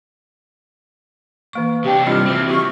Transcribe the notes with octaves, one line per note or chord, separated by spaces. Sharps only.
E3 A#3 C#6
C3 D4 G4
G2 C3 G3 F4 F6
E3 C4 F#4
G4 C#6